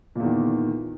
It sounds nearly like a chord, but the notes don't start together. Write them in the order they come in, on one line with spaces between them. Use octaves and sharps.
A#2 E2 D#3